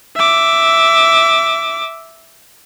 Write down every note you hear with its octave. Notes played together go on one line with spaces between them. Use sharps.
E5 D6